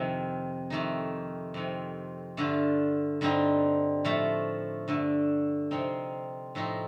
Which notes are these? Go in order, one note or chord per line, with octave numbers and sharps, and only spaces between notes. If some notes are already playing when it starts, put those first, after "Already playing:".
Already playing: F2 C3 D#3
F2 D#3 A3 D#4
F2 C3 D#3
G2 D3 A3 D4 F4
G2 D3 G3 C4 D#4
A2 F3 A3
G2 D3 A3
C3 F3 C4 D#4
A2 F3 C4 D#4